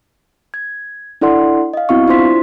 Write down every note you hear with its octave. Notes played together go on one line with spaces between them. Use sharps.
G#6
D4 E4 A4 D5 F#5 C6
D#5 F5
B3 C4 E4 F#4 F5 C#6
D4 E4 F4 C5 C6 B6